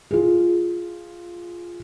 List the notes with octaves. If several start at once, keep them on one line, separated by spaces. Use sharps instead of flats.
F4 G#4